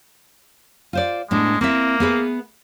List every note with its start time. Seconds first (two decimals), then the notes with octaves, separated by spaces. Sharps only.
0.93 F4 C5 D5
1.31 A2 G#3 B3 D4
1.61 A#3 C4 E4 E5
2.00 B3 G#4 B4